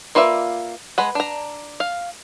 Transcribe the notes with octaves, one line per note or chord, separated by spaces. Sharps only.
A#3 F4 B4 D5 E5
G#3 B4 F#5
D4 A#5
F5